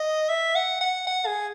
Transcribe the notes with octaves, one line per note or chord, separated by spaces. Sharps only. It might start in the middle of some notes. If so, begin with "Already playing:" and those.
Already playing: D#5
E5
F#5
F#5
F#5
G#4